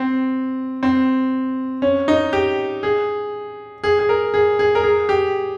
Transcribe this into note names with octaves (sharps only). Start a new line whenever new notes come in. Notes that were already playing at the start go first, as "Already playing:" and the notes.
Already playing: C4
C4
C#4
D#4
G4
G#4
G#4
G#4
A#4
G#4
G#4
A#4
G#4
G4